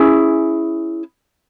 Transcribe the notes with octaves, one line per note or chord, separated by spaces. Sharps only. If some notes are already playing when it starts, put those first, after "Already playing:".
Already playing: C#4 E4 G#4